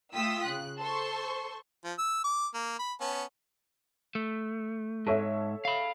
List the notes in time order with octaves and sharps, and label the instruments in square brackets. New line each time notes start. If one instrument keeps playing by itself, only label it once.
[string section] A3 F4 G5 D#6 E6 B6
C#3 F#6
A4 C5 C6 C#6
[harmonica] F3
E6
D6
A#3
B5
B3 C#4 A5
[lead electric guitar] A3
[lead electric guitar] G#2 [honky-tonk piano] A4 C#5 E5
[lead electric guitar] F5 B5